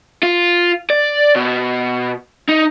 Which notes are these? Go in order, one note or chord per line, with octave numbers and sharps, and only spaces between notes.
F4
D5
B2
D#4